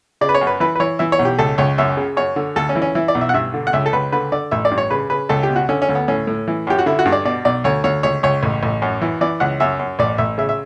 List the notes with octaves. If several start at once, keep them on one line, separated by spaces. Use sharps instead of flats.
C#3 D5
B4
C#5
F#2
B4
E3 B4
B4
E3 C#5
E3 E5
C#5
B1
G4
C#2 A4
C#2 C#5
F#2 E5
C#3
F#2 C#5
D3
D2 A4
C#4
E3
C#4
E3 E4
D5
B1
E5
F#5
G2 E5
D3
F#5
C#2 E5
A4
C#2 B4
D3 B4
D3 D5
A1 E5
D5
G2
C#5
C#3 B4
C#3 B4
C#2 A4
G4
B2
F#4
D3 C#4
C#4
D2
B3
A2 C#4
A2
E3
F#2 G4
F#4
D3 E4
F#4
G2
D5
B2 D5
B1 D5
D2 C#5
D2 C#5
C#2 C#5
C#2 C#5
A1
A1
F#2
E3
E3 D5
C#2 F#5
F#2 E5
F#2
A1 D5
A1 E5
C#3 E5
E5